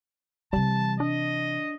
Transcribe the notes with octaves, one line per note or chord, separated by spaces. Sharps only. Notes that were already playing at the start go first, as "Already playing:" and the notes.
C3 E3 G3 A5
D4 D#5